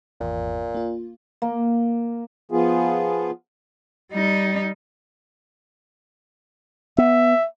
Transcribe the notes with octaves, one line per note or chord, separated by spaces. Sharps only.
G#1 E2 A#2
A#3 F4
A#3
F3 B3 F4 G#4
G3 D#4
B3 E5